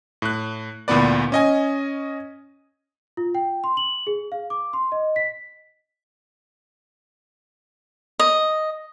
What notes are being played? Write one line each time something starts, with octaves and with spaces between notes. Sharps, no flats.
A2 F#6
D2 A#2 E3 B3 B4 D5
C#4 D#5 G#5
F4
G5
C6
F#7
G#4
F5
D6
C6
D#5
B6
D#5